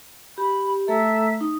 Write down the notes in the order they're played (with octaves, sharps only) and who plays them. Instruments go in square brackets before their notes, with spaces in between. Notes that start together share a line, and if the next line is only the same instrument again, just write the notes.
[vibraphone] G4 [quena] B5
[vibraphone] A3 A4 A#5 [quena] E5
[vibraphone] D#4